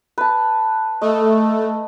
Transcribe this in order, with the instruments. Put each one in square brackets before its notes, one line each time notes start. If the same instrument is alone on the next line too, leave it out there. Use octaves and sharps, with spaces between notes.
[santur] B4 A5
[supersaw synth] A3 [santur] D#5